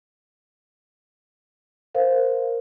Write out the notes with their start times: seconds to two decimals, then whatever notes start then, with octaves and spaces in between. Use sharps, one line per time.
1.95 A#4 C5 F5